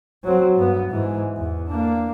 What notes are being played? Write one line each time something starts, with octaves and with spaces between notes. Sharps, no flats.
F#3 C4
G2 B3
G#2 E3
E2
A#3 D4